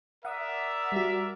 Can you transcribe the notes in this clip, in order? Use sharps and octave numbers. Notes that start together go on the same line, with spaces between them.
A#4 D5 E5 F#5 D#6
G3 F#4